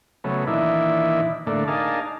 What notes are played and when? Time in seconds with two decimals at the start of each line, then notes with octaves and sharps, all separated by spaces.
0.24 C#3 F#3 A3 B3
0.47 A#2 D#3 E3 D4 E4
1.47 A2 D3 A3 A#3 D4
1.68 D4 D#4 G#4 A#4 F5 A5